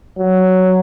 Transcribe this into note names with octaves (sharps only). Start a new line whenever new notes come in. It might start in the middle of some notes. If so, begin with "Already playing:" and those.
F#3